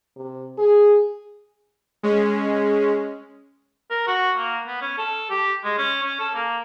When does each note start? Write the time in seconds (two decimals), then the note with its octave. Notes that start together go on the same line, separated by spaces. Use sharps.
0.16 C3
0.58 G#4
2.03 G#3 C#4
3.90 A#4
4.08 F#4
4.37 A#3
4.67 B3
4.82 C#4
4.98 A4
5.30 G4
5.64 G#3
5.78 C#4
6.03 C#4
6.20 A4
6.35 A#3